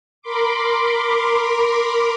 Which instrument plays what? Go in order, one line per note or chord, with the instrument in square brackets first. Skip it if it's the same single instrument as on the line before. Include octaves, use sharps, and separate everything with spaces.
[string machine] A#4 B5 C6 D6